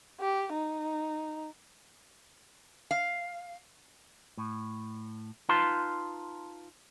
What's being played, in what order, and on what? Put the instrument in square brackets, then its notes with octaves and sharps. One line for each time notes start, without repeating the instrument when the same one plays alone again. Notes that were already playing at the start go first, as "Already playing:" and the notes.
[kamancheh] G4
D#4
[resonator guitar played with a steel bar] F5
[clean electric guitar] A2
D#4 F4 B4 F5 A5 C6